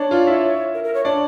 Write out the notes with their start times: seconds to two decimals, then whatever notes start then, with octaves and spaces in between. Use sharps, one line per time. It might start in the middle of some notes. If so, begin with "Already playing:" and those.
Already playing: D4 C#5 D5
0.11 F4 F5
0.27 E4 E5
0.74 A#4
0.84 A#4
0.94 C#5
1.05 D4 C#5 D5